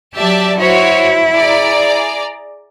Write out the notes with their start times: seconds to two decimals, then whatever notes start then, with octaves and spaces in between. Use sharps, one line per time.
0.15 F#3 G4 D5 E5 A5
0.59 E4 F#4 C5 C#5
1.35 G#4 D5 A#5